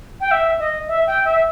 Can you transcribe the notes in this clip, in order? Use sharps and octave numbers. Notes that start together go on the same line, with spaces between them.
G5
E5
D#5
E5
G5
E5